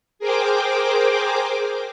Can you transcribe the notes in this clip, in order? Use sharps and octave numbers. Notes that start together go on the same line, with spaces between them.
G#4 A#4 C5 G5 D6